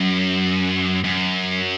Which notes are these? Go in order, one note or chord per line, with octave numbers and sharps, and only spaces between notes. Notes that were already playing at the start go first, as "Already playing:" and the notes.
Already playing: F#2
F#2